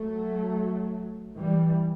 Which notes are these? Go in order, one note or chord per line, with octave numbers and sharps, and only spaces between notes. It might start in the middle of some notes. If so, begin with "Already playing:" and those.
Already playing: F#3 A3
E3 G3